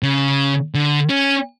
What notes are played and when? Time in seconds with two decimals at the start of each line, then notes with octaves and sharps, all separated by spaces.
0.03 C#3
0.74 D3
1.09 C#4